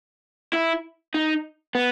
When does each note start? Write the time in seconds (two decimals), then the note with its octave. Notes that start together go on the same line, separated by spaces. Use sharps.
0.53 E4
1.15 D#4
1.75 B3